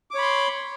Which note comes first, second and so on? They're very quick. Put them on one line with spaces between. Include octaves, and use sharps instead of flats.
D6 C#5 B5 C6